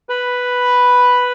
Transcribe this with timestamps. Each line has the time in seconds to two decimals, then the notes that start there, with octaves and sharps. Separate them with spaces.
0.09 B4 B5